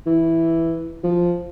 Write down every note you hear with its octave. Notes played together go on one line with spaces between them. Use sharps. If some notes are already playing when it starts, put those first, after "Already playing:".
E3
F3